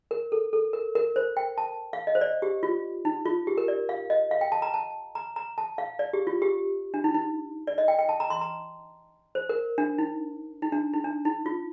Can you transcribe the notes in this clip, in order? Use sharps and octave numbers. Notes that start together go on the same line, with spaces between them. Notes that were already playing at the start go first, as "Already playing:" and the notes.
A#4
A4
A4
A#4
A#4
C5
G5
A5
F5
D#5
C5
D5
G4
F4
D#4
F4
G4
A#4
D5
F5
D#5
F5
G5
A5
A#5
A5
A#5
A#5
A5
F5
D5
G4
F4
G4
D4
D#4
D#4
D5
D#5
G5
G5
A5
A#5
C6
A#5
C5
A#4
D4
D#4
D#4
D4
D#4
D4
D#4
F4